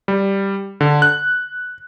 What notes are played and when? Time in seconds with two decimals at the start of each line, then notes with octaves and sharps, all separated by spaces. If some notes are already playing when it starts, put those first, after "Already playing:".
0.08 G3
0.81 D3
1.02 F#6